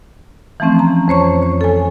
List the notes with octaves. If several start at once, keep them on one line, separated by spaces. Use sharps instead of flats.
E3 F3 A3 C4 C#4
A#5
F2 C5 C#5 C#6
C#5
A4 G#5